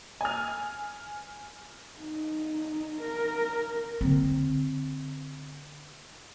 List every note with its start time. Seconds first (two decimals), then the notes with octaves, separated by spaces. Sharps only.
0.21 G#5 F6
2.00 D#4
3.02 A#4
4.01 D3 C4